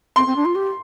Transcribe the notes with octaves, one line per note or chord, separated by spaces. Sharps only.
C4 C6
C4
D4
F4
G4